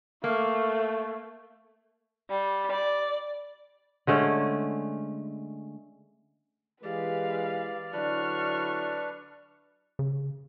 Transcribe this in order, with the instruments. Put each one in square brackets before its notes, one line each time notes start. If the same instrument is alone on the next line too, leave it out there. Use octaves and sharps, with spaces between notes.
[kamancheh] A3 [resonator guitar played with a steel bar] A#3
[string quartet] G3
D5
[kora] D3 G#3 A3 C#4
[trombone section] E3 G#3 [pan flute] G4 [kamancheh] B4 F5 [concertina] D5
[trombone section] D3 F#3 E4 [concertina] D4 B4 [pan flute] D5 [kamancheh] C#6 F6
[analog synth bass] C#3